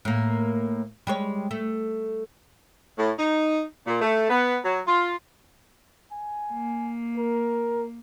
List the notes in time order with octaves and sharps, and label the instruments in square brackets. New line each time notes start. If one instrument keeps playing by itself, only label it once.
[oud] A2 A#3
G3 G#3 C#5
A3
[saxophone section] A2
D#4
A#2
A3
B3
F#3
F4
[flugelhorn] G#5
[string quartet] A#3
[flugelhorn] A#4